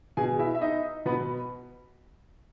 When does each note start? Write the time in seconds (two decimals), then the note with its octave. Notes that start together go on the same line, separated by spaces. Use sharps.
0.17 B2 G#4 G#5
0.39 E4 E5
0.55 E5
0.61 D#4 D#5
1.05 B2 B3 B4